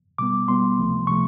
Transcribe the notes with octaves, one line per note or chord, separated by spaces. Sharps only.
B2 G3 B3 D6
B2 G3 B3 C6
C#2 C3 F3 A3
C3 F3 A3 C#6